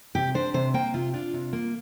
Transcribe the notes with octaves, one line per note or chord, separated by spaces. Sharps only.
C3 G4
D4 C5
C3 C5
A#3 G5
C3 F4
D4 F4
C3
A#3